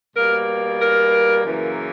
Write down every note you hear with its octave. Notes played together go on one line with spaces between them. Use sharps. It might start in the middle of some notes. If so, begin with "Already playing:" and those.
B2 G3 A#3 A#4
A#4
F#2 C#3 E3 A#3